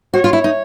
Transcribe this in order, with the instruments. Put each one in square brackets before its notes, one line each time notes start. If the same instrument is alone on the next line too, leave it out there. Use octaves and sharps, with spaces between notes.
[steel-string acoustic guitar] F#4 [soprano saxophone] C#5
[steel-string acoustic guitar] F4
E4
D#4